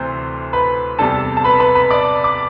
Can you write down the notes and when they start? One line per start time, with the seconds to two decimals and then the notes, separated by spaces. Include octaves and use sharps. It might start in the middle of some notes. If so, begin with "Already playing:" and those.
Already playing: D2 C3 E3 C5 C6
0.53 B4 B5
0.99 E2 C3 G3 D4 A4 A5
1.37 A5
1.44 B4 B5
1.60 B4 B5
1.75 B4 B5
1.91 D5 D6
2.24 D6